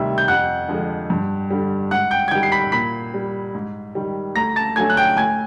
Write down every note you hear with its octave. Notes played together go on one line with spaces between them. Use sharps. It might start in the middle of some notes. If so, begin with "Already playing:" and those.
Already playing: D2 C3 D#3 G3 E5
G6
F2 F#5 F#6
D3 F3 G#3
G2
D3 G3
G#2 F#5 F#6
G5 G6
G#6
D#3 G3 G5 G6
C7
B5 B6
A#2 B5 B6
G3
G#2
D#3 G3
D2 A#5 A#6
A5 A6
D3 F#3 A3 G#5 G#6
F#6
G5 G6
A2 G#5 G#6